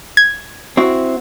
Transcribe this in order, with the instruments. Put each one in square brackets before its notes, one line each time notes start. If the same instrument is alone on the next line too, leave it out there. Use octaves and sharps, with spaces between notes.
[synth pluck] G#6
[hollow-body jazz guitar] C4 E4 F#4